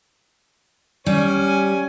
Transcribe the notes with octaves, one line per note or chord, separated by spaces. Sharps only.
G3 C#4 G#5